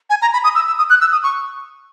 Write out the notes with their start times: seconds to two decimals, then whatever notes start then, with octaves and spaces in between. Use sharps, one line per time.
0.10 G#5
0.22 A#5
0.33 B5
0.44 D#6
0.55 E6
0.67 E6
0.78 D#6
0.90 F#6
1.01 E6
1.12 D#6
1.23 C#6